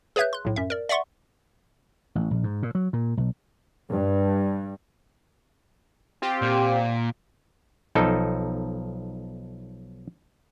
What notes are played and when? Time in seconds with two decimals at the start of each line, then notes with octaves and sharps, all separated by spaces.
0.16 G#4 B4 C#5 E5 F#6 G6
0.33 C6 F#6
0.45 B1 A2
0.56 F#2 E5
0.70 A#4 D5
0.89 D5 E5 F#5 C6 C#6
2.15 A1
2.31 A#1
2.44 G#2
2.63 A#2
2.75 F#3
2.93 A#2
3.17 B1
3.91 G2
6.22 C4 F4 G4
6.42 A#2
7.95 B1 F3 D#4 A4